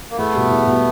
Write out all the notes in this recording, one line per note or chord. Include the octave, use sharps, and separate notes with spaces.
A#3
E2 A3 B3
B2 G3
E2
B2 G3